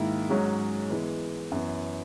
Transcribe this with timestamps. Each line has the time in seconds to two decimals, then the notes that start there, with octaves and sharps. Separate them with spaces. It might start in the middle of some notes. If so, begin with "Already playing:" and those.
Already playing: G#2 D#3 A#3 E4
0.29 G#2 F#3 C#4 G#4
0.90 E3 G#3 B3
1.52 F#2 E3 B3